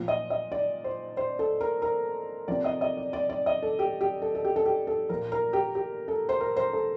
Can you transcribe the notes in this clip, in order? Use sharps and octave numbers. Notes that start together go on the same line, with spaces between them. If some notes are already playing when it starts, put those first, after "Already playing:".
Already playing: A#2 F3
D#5
D#5
D5
C5
C5
A4
A#4
A#4
C3 F3 D5
D#5
D#5
D5
D5
D5
D#5
A4
G4
G4
A4
A4
G4
A4
G4
A4
A#2 F3 A#4
A#4
G4
G4
A4
C5
A#4
C5
A4